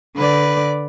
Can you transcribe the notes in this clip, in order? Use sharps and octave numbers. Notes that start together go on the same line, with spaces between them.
D3 B4 D5